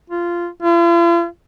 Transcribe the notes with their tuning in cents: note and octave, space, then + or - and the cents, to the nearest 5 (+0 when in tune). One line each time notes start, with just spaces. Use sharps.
F4 -15
F4 -45